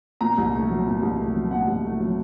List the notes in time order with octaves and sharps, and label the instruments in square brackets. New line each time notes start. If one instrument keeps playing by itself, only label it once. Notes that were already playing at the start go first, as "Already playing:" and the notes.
[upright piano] A#2 A#5
C2
A3
F#3
A#2
C2
A3
F#3
A#2 F#5
C2
A3
F#3